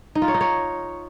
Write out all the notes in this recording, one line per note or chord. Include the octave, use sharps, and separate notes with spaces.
D#4
F4
C#5
D#4
C#5